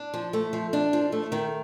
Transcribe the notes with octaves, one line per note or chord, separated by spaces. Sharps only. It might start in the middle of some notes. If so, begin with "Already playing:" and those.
Already playing: D4
F3
A3
F3
D4
F3
A3
D#3